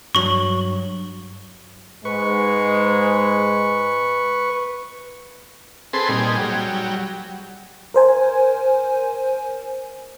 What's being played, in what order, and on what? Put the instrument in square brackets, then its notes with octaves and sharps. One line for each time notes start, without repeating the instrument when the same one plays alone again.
[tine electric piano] G2 F#3 [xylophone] C#6 F#7
[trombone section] G#2 G#3 [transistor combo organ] B4 C#6
[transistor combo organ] C4 G#4 A4 B4 C6
A#2 G3 D#4 G#4
F#3 G3
[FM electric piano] A#4 C5 G#5